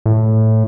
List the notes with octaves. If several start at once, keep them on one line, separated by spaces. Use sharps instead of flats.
A2